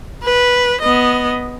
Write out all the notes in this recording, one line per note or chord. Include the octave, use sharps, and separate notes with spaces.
B4
B3 D#5